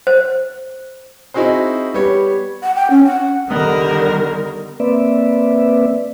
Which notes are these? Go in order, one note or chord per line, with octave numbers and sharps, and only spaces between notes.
C5
C4 D#4 E4 F#4 G#4 C5
G3 B3 C#5
F#5
G5
C#4
F#5
D3 D#3 G3 B3 D#4 A#4 F#5
A#3 C4 B4 D5 E5